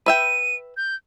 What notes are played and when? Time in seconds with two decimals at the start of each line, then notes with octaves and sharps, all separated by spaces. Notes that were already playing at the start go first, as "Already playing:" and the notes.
0.06 B4 E5 G5 D#7
0.77 G6